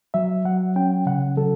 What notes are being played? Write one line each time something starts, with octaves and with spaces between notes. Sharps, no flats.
F#3 E5
F#3 F#5
C#4 G5
C#3 F#5
F#3 A4